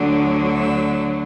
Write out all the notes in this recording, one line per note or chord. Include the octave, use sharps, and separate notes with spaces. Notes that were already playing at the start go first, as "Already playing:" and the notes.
Already playing: D2 D3 F#3
E5